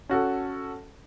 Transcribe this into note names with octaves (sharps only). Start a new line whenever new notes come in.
C#4 F#4 A4